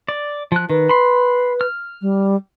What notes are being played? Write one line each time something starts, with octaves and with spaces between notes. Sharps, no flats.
D5
F3 F#6
D#3 B4
B5 C6
F6
G3